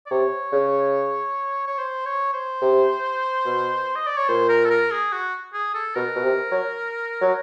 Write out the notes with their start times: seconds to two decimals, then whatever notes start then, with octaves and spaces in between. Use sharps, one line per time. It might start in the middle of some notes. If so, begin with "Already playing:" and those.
0.06 D5
0.11 C3 C#5
0.52 C#3
1.67 C#5
1.78 C5
2.06 C#5
2.34 C5
2.61 C3
3.45 B2
3.96 D#5
4.06 D5
4.17 C#5
4.28 A#2 C5
4.49 A#4
4.65 A4
4.71 A#4
4.91 G#4
5.12 F#4
5.54 G#4
5.74 A4
5.95 B2 A#4
6.16 B2
6.23 C3
6.51 F#3
7.21 F#3